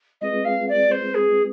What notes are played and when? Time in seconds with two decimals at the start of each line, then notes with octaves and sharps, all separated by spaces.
0.21 G#3 C4 F4 G#4 B4 D#5
0.45 F5
0.68 D5
0.91 C5
1.14 G#4